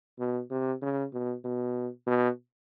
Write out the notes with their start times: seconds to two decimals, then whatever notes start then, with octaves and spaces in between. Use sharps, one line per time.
0.19 B2
0.51 C3
0.82 C#3
1.13 B2
1.44 B2
2.07 B2